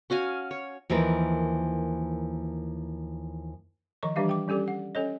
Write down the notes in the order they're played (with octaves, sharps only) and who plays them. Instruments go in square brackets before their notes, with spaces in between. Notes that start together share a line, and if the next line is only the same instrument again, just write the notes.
[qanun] C#4 F#4 F5 G#5
C#5
[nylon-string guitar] D#2 E3 F3 A#4 B4
[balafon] D#3 F3 D#5 C#6
E3 G3 D4 G4 E5 F5
G5 D6
G3 C#4 G4 A4 D5
F#5
C#4 A4 C#5 D#5